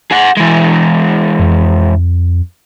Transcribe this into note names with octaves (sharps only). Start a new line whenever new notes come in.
G#4 F#5
E3 G#3
F2